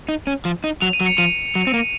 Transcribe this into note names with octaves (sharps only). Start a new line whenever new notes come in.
D#4
C#4
F3
D#4
F#3 F7
D#7
F#3
C#7
F3 D#7
F#3
C4
A#3